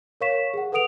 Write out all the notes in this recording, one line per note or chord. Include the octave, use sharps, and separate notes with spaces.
A#4 C#5 F5 C#6 B6 E7
G#4 F#5
A4 B4 F#5 D#6 D7 F7